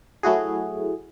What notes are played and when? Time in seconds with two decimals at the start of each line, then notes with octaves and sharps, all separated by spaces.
0.23 F#3 A3 E4 F#4 G#4